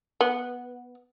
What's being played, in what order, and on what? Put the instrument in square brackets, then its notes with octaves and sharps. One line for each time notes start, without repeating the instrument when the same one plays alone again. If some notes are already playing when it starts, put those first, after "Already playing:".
[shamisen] B3